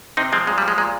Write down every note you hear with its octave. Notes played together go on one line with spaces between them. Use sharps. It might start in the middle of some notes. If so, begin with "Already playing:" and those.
C3 C4 D#4
F3 G#3 C4
A#2 G#3
G3
F3
G#3
A#2 G#3